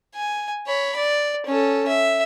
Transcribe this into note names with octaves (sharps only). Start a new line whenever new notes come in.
G#5
C#5 B5
D5
C#4 A4
E5